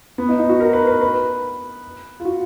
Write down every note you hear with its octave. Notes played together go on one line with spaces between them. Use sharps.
B3
D#4
D#4
F#4
A#4
B4
B4
B4
F4
F#4